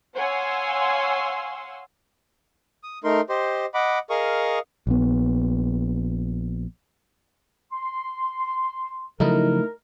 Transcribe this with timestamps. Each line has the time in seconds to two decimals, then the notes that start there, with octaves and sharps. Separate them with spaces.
0.17 C#5 F5 F#5 G#5 C6 E6
2.83 D#6
3.04 A3 D#4 A#4 C6
3.29 G4 C5 D#5 C6
3.74 D#5 F#5 B5 D6
4.10 G#4 A#4 D#5 F5 C#6 D#6
4.87 A#1 B3
7.72 C6
9.20 C#3 F3 F#3 A3 D#4 E4 A#4